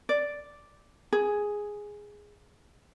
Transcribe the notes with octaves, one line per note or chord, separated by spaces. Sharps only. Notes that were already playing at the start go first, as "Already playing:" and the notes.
D5
G#4